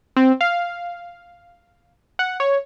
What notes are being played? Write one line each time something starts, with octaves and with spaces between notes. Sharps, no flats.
C4
F5
F#5
C#5